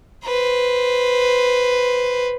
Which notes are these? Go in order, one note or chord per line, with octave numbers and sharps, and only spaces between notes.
B4 C5